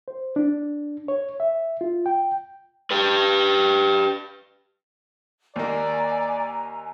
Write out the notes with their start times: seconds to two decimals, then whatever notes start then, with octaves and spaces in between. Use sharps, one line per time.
0.08 C5
0.36 D4
1.08 C#5
1.40 E5
1.81 F4
2.06 G5
2.91 G4 B4
5.56 D#2 A#3 D5 G#5 A#5